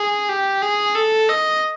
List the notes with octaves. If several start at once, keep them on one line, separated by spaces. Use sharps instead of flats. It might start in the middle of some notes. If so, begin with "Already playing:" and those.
Already playing: G#4
G4
G#4
A4
D#5